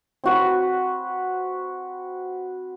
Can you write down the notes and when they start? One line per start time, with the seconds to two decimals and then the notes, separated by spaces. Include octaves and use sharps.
0.24 C4 F#4 B4